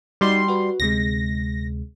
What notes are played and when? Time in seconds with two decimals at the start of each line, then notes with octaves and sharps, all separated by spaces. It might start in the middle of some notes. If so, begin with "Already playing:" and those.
0.21 G3 D#4 F#4 D5 C6
0.48 F#4 B4
0.80 D2 C3 G#3 A#6